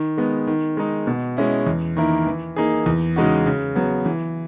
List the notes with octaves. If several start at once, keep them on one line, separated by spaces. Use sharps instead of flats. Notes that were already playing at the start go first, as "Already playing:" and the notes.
Already playing: D#3
G#3 B3
D#3
G#3 D#4
B2
G#3 C#4 E4
E2
D#3 A#3 E4 A#4
E3
A#3 D#4 G#4
E2
C#3 G#3 D#4 F#4
C#3
F#3 B3
E3